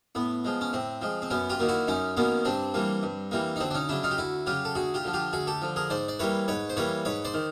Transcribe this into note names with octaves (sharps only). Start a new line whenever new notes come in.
A2 B3
F3 G#3
C#4
A2 C4
F3 G#3
C4
F#2 B3 C#4
F4 G4
D#3 F#3 A#3
E4 F#4
F#2 C#4 D#4
D#3 F#3 A#3 B3 C#4
G2 C4 D4
E3 G3 A#3
G2
E3 G3 A#3
D#4
D2 C4 D4
D4
C#4 D#4
C#3 F#3 D4 E4
D#4 F4
G4
D2 E4 F#4
C#3 F#3 F4 G4
A4
D2 F#4 G#4
F4 G4
D3 F3
F4 G4
D2 F#4 G#4
G4 A4
D3 F3
G#4 A#4
G#2 C5 D5
D5
E3 G3 A#3 B4 C#5
G#2 B4 C#5
C5
E3 G3 A#3 B4 C#5
G#2 B4 C#5
C5 D5
D#3